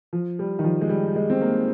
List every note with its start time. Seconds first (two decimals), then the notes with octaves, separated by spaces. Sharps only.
0.13 F3
0.39 G3
0.59 D#3
0.64 F3
0.81 G#3
0.89 G3
1.15 G#3
1.30 C4
1.41 A#3